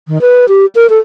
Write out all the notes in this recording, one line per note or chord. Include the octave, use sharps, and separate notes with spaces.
D#3
B4
G4
A#4
A4